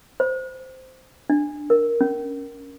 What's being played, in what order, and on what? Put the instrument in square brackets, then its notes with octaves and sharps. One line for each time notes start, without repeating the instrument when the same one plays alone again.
[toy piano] C5
D4
A#4
C#4